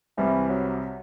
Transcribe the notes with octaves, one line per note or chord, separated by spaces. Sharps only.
C2 C3 E3 G3 C4
F#3